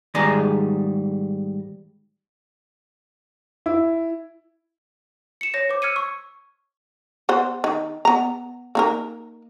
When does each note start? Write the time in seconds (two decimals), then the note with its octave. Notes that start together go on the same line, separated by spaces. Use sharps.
0.14 G#2 D#3 G3 G#4 D5 A#5
3.66 E4
5.41 C#7 E7
5.54 C#5 A#6
5.69 C5 D6
5.82 E6 F6 G#6 C#7 D#7
5.96 C#6
7.29 B3 C5 F#5
7.64 D#3
8.05 B3 A#5
8.75 A#3 D#4 A#4